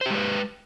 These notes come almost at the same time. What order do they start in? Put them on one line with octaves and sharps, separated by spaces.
C5 G4 G#3 B4